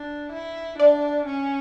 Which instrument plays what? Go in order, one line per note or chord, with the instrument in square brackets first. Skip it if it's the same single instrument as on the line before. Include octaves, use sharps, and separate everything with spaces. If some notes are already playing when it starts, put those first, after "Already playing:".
Already playing: [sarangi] D4
E4
[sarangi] D4 [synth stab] D5
[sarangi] C#4